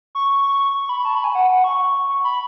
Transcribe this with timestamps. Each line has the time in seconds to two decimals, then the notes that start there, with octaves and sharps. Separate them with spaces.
0.15 C#6
0.74 C#6
0.89 B5
1.05 A5
1.15 B5
1.24 G#5
1.35 F#5
1.50 F#5
1.64 C#6
2.24 B5